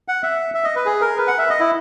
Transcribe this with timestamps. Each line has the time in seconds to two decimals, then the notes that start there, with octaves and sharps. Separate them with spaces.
0.08 F#5
0.23 E5
0.54 E5
0.64 D#5
0.76 B4
0.86 G#4
1.01 A#4
1.18 B4
1.28 F#5
1.38 E5
1.50 D#5
1.60 E4